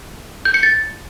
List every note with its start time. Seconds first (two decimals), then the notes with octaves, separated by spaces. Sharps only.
0.45 G6
0.54 C#7
0.63 A6